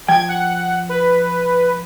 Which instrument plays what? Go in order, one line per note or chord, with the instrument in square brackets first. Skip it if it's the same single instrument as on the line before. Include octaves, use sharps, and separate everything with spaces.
[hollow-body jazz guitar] F3 G5 [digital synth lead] G#6
[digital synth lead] F#5
B4